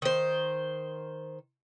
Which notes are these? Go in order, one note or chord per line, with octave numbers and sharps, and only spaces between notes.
D#3 C5